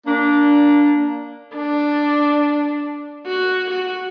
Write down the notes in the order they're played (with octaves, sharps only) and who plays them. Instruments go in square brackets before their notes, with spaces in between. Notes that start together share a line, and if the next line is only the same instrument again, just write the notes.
[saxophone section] A#3 D4
[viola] D4
F#4
F#4